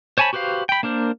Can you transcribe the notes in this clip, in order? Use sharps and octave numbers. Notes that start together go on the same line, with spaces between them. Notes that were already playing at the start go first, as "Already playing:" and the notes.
C5 C#5 G#5 A5 B5
F#4 G4 B4 C5 F5
G5 B5
A#3 D4 A#4 C5